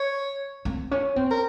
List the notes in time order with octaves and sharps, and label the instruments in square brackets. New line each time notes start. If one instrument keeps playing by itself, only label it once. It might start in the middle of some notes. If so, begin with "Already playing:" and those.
Already playing: [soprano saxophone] C#5
[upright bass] C4
C#4
C4
[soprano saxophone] A#4